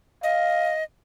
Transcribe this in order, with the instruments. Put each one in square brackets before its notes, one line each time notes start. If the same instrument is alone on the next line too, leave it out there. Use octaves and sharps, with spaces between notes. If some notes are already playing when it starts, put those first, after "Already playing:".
[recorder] D#5 [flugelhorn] F5